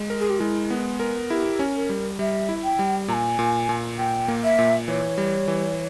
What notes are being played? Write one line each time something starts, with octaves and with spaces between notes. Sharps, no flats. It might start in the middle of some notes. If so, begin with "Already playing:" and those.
Already playing: G#3
A#4
G#4
G4
G#3 E4
B3
A#4
E4 G4 G#4
C#4
A#4
G3
G3 E5
E4
G5
G3
A#2 G#5 A#5
A#2
A#2
A#2 G5
A#3
E5
A#2
E3 C#5
G3
E3